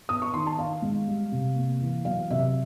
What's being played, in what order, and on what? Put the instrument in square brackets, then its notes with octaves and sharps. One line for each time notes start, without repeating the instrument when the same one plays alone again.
[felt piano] B3 D#6
C#6
D#3 C6
A5
D#3 F5
G#3
G3
C3
A#3
E3
F#3 F5
C3 E5